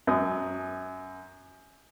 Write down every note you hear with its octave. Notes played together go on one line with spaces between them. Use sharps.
F#2 D#6